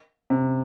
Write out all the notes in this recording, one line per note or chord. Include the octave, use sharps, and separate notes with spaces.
C3